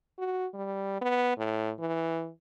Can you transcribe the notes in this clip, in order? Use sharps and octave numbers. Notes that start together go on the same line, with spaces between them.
F#4
G3
B3
A2
E3